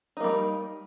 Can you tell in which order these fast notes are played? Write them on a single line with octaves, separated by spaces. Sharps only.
D#4 A#3 G3